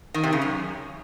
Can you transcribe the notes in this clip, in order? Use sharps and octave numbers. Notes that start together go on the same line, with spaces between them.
D#3
C3
C#3
F#2